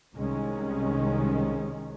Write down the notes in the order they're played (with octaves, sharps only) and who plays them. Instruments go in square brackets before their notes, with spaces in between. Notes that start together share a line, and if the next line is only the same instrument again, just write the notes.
[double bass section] C2 C3 D#3 G#3 C#4